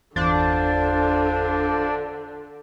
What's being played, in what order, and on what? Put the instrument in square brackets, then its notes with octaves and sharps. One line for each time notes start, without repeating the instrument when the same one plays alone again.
[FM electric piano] G1 E2 A6 [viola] D3 [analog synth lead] D4 [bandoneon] F4 C5